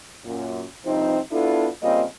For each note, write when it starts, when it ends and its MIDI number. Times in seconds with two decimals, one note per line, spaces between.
0.24 0.63 42
0.24 0.63 46
0.85 1.17 43
0.85 1.17 48
0.85 1.17 53
0.85 1.17 60
0.85 1.17 63
1.31 1.67 59
1.31 1.67 62
1.31 1.67 64
1.31 1.67 65
1.31 1.67 69
1.81 2.03 49
1.81 2.03 55
1.81 2.03 58
1.81 2.03 60
1.81 2.03 65
1.81 2.03 75